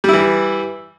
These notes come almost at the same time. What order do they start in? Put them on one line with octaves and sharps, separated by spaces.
G3 E4 E3